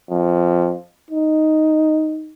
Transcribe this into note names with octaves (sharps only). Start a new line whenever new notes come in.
F2
D#4